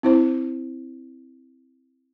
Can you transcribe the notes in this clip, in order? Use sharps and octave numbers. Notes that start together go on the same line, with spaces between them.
C4 E4 C5